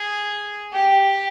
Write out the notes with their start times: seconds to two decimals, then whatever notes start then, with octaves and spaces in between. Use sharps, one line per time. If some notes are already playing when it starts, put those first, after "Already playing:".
Already playing: G#4
0.73 G4